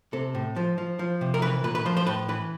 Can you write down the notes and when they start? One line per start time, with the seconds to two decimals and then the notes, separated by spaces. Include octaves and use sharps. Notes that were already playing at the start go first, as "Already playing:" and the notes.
0.13 C3 A4
0.35 A2
0.56 F3
0.78 F3
0.99 F3
1.21 C3
1.34 A#4
1.42 E3 B4
1.64 A#2 B4
1.75 B4
1.85 F3 C5
1.97 C5
2.07 A2 B4
2.29 E3 B4